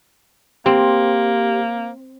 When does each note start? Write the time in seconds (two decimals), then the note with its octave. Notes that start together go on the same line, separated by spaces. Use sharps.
0.66 A#3 C4 G4